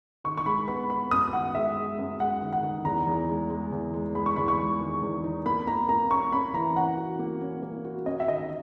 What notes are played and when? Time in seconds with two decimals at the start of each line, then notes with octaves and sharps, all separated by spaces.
0.24 D#3 C#6
0.38 C#6
0.46 G#3 B5
0.67 B3 B5
0.90 B3 B5
1.11 F#2 D#6
1.33 D#3 F#5
1.55 G#3 E5
1.77 G#3
1.98 F#2
2.20 G#3 F#5
2.42 D#3
2.53 F#5
2.63 D#3
2.85 E2 A#5
3.07 E2
3.29 G#3
3.50 G#3
3.72 E2
3.94 G#3
4.15 G#3 B5
4.26 C#6
4.36 E2 B5
4.48 C#6
4.59 G#3
4.81 D#3
5.03 E2
5.24 D#4
5.46 A#3 B5
5.67 A#3 A#5
5.89 A#3 A#5
6.11 C#4 C#6
6.32 C#4 B5
6.54 E3 A#5
6.76 C#4 F#5
6.97 F#4
7.19 A#3
7.41 C#4
7.63 A#3
7.84 F#4
8.06 C#4 D#5
8.20 E5
8.28 D#3 D#5